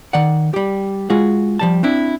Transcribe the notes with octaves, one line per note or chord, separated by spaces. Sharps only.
D#3 D5 F#5
G3 G4
G#3 F4 F#4 G#4
F3 G3 A5
C4 D4 E4